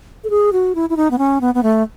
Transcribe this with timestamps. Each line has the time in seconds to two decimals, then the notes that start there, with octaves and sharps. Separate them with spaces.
0.24 A4
0.30 G#4
0.53 F#4
0.75 E4
0.90 E4
0.97 D#4
1.11 B3
1.18 C#4
1.41 B3
1.54 B3
1.63 A3